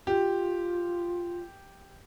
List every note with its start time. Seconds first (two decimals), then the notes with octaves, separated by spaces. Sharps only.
0.07 F4 G4